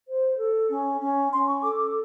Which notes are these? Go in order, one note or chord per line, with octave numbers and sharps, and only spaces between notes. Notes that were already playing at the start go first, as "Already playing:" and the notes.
C5
A4
C#4
C#4
C#4 C6
C#6
A4 D6
D6